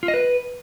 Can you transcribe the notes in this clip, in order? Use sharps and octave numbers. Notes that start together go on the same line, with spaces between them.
F4
D#5
B4